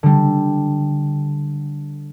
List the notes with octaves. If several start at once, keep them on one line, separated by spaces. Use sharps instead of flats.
D3 G3